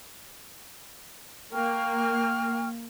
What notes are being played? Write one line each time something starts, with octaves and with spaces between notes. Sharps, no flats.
A#3 G5 C#6 F6